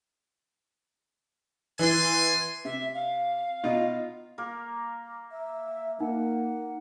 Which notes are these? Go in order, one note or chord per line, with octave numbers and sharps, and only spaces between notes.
E3 D5 G#5 C6
C3 E5
F5
B2 D#4 F4
A#3 A#4
E5
A#3 D#4 F#5